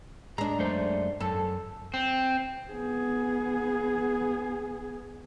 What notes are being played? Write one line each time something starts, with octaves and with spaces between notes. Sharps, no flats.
G#3 D4 A#5
F#2 A3 C5
F#2 A4 A5
C4
B3 G#4